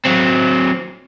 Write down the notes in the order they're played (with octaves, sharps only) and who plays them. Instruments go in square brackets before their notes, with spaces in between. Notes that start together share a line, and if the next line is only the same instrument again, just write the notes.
[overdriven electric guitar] F#3 C4